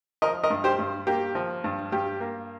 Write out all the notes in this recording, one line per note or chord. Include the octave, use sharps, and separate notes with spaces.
F3 A#4 D#5
A#4 D#5
G2
G4 C5
G2
A#3 G4
F3
G2
G2 G4
A#3